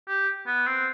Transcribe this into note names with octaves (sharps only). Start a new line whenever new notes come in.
G4
B3
C4